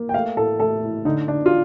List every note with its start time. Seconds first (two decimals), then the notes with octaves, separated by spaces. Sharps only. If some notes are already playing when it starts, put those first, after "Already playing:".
Already playing: A#3
0.09 G5
0.14 A3 F5
0.37 A2 A4
0.60 A3 A4
0.83 A2
1.05 D3 D#4
1.28 D3 D4
1.46 F4